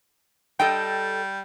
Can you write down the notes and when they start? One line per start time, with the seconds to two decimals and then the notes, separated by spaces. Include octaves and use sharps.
0.60 G3 A4 D#5 G5